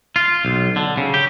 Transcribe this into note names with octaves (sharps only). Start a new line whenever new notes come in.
F4
B1
D3
C#3
G4